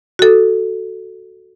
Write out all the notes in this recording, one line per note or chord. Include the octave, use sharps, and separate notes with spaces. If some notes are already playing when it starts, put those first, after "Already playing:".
F#4 A4